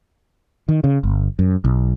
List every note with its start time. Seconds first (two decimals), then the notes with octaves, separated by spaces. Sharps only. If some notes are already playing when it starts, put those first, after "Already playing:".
0.68 D#3
0.84 C#3
1.03 G1
1.39 F#2
1.64 B1